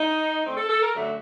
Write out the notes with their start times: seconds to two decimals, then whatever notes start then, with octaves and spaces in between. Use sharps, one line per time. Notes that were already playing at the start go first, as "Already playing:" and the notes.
Already playing: D#4
0.44 D3 A3 C4
0.57 A4
0.69 A4
0.82 A#4
0.95 F#2 D3 F#3 A3